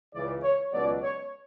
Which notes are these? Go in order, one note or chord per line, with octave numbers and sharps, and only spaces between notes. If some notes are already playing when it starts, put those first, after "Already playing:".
C#2 C#3 E3 D5
C#5
C#2 B2 F#3 D5
C#5